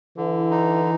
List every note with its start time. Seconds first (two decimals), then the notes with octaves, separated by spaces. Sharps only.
0.17 D3 E3
0.51 D#4